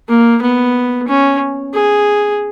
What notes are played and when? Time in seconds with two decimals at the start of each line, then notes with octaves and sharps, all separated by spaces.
0.09 A#3
0.42 B3
1.08 C#4
1.74 G#4